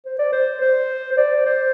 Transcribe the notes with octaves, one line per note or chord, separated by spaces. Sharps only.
C5
D5
C5
C5
C5
D5
C5